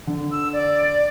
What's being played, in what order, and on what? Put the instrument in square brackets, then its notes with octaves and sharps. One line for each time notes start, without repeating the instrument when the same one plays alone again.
[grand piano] D3
[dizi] E6
D5